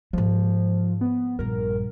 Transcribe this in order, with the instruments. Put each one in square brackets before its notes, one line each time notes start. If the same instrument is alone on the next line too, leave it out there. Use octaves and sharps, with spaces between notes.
[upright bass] G#2 G#3 [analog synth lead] F3
[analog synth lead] B3
[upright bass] A#1 G2 [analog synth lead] A#4